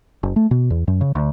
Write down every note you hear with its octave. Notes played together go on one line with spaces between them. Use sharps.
F#1
A3
B2
E2
F#2
C#3
D2